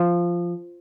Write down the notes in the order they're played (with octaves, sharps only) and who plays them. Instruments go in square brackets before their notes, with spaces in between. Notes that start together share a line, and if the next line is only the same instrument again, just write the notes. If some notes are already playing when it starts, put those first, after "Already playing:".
Already playing: [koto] F3